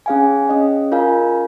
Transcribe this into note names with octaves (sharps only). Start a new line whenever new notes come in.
C#4 G#4 F5 G#5
C#4 G#4 D#5
F4 A#4 F5 G#5